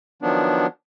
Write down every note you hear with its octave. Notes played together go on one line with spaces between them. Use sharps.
D#3 F3 F#3 B3 D4